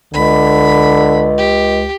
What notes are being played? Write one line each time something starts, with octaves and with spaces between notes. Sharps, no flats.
C#2 D3 B5
G4